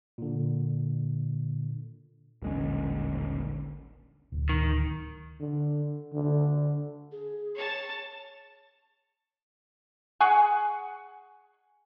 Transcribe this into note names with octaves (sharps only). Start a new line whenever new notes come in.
A#2 D3
D#1 A1 D3 G#3 C#4
D1
D#3
D3
D3
G#4
C#5 A5
G#4 F#5 G#5 C#6